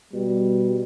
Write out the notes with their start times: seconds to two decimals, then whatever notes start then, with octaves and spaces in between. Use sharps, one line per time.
0.13 B2 G3